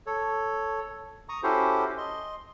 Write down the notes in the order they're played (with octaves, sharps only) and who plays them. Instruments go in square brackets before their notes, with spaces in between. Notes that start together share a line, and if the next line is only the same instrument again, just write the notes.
[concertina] A4 C#5
A#5 C#6 D#6
C#4 E4 F#4 G4 A4 C5
D#5 C6